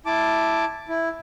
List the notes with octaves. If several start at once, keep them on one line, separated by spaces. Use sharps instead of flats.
E4 A5 D6
E4